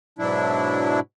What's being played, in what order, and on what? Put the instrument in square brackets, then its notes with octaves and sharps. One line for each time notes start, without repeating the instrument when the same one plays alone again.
[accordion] G#2 B2 F#3 D4 E4